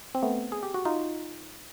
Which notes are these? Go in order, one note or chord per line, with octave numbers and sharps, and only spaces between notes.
C4
A3 B3
G#4
G4
F#4
D#4 F4